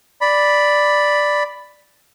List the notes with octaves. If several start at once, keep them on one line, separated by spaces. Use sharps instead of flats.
D5 B5